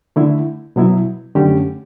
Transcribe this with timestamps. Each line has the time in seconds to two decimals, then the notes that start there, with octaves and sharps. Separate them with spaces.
0.16 D3 A3 E4
0.76 B2 F#3 B3 E4
1.35 F#2 D3 A3 C#4 G4